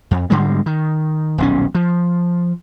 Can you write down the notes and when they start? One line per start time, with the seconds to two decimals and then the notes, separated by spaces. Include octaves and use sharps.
0.11 F2
0.30 G#2 D3 G3 G#3
0.66 D#3
1.38 D#1 B1 C#4
1.75 F3